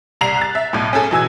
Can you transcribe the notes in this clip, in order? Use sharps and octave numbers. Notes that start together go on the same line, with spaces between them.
C2 A#5 C7 F7
F#6 A6
E5
B1 A2
C#4 G#4 A4 G#5
B2 E3 G#5 E6 G#6